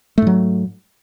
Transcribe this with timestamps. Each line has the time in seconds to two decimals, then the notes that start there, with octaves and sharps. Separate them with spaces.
0.18 A3
0.22 G#2
0.27 F#3